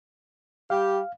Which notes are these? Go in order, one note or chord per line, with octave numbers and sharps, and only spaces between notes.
G3 G4 F5